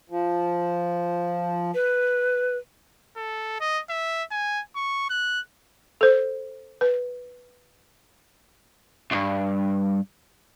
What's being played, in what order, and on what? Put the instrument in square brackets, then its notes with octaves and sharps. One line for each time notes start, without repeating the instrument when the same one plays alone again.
[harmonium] F3
[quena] B4
[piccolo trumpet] A4
D#5
E5
G#5
C#6
F#6
[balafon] A4 C5
B4
[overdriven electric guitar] C2 G2